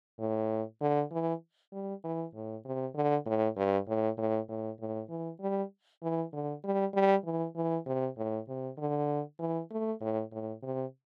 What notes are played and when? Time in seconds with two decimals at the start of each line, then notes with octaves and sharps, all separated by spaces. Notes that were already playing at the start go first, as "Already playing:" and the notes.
0.19 A2
0.81 D3
1.11 E3
1.73 G3
2.04 E3
2.34 A2
2.65 C3
2.95 D3
3.26 A2
3.57 G2
3.88 A2
4.18 A2
4.49 A2
4.80 A2
5.10 E3
5.41 G3
6.03 E3
6.33 D3
6.64 G3
6.94 G3
7.25 E3
7.56 E3
7.86 C3
8.17 A2
8.48 C3
8.78 D3
9.39 E3
9.71 A3
10.01 A2
10.32 A2
10.63 C3